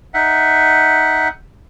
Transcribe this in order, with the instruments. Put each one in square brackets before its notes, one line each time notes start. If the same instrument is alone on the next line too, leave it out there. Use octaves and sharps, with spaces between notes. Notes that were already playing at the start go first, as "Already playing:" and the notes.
[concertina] D#4 E5 F#5